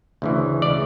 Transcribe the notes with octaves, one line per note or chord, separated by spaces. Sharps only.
D2 C#3 E3
C#3 E3 D5